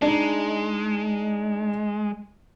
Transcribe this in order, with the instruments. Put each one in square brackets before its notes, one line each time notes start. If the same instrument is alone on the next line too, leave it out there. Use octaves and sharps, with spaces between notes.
[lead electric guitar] G#3 [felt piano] D4 D#4